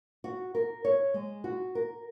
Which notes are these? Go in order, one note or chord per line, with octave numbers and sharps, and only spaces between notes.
F#4
A#4
C#5
G#3
F#4
A#4